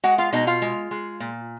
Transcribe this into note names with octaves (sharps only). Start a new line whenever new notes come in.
G#3 F#4 F#5
F4 F5
B2 D#4 D#5
F4 F5
G#3
G#3
A#2